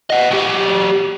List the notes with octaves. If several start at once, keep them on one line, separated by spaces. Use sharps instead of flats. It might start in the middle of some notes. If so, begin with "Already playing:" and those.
D#5 F#5
F#3 G4